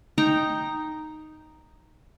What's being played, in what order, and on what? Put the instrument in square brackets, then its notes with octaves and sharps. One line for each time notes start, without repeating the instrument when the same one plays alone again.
[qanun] D#4 G5 A#5